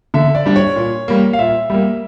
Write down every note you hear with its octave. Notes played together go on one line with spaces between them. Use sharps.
D3 E5
D5
G3 D4 D5
C#5
A#2
G3 A#3
F5
A#2 E5
G3 A#3